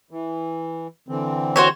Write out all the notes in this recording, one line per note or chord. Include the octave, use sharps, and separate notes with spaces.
E3
D3 E3 C4
F#4 C5 C#5